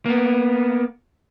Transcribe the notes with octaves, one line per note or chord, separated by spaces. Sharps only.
A#3 B3